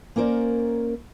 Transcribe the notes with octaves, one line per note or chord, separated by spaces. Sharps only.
A#3 C#4 A#4 C5 D5